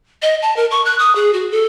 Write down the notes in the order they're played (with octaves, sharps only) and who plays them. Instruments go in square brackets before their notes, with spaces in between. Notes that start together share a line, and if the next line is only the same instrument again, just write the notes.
[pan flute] D#5
A5
A#4
C#6
F#6
D#6
G#4
F#4
A4